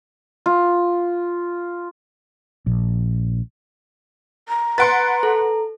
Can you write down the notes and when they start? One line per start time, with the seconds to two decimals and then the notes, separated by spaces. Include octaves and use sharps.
0.46 F4
2.67 A#1
4.49 A#5
4.78 B4 F#5 C6 A6 D7
5.23 A4